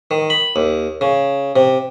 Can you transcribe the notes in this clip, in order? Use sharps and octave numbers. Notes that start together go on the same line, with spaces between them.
D#3
B5
D#2
C#3
C3